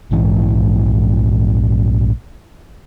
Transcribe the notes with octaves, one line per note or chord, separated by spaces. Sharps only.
A#1 G#2 E3